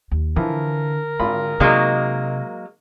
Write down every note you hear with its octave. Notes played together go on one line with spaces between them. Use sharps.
D#2
D3 E3 F3 A#4
G#1 D3 F4 B5
C3 F#3 G#3 A#3 D#4 C6